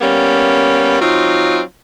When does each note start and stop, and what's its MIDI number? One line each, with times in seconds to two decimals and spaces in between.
0.01 0.96 55
0.01 0.96 58
0.01 0.96 59
0.01 0.96 61
1.00 1.61 54
1.00 1.61 60
1.00 1.61 63
1.00 1.61 65